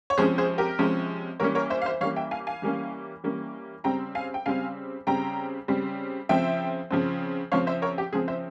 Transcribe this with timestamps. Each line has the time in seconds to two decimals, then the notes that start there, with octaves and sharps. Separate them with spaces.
0.10 C#5
0.17 C3 F3 G#3 C#4 G#4 C5
0.38 G#4 C5
0.58 G4 A#4
0.79 C3 F3 G#3 C#4
1.40 E3 G3 A#3 C#4 A#4 C#5
1.55 A#4 C#5
1.70 C5 E5
1.82 F5
1.86 C5 E5
2.01 E3 G3 A#3 C#4 C#5 F5
2.16 E5 G5
2.31 F5 G#5
2.47 F5 G#5
2.62 E3 G3 A#3 C#4
3.24 E3 G3 A#3 C#4
3.84 C#3 G3 C4 G5 A#5
4.15 F5 G#5
4.34 G5
4.46 C#3 G3 C4 F5 G#5
5.07 C#3 G3 C4 G5 A#5
5.68 C#3 G3 C4
6.29 C#3 F3 C4 E5 G5
6.91 C#3 F3 C4
7.52 C#3 F3 C4 C#5 F5
7.67 C5 E5
7.82 A#4 C#5
7.98 G4
8.13 C#3 F3 C4 G#4
8.28 C5 E5